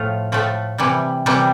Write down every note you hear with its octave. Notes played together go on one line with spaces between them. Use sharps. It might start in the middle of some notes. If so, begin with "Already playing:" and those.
Already playing: A2 F3 A3 F4
A2 F3 A3
C3 E3 G3
C3 E3 G3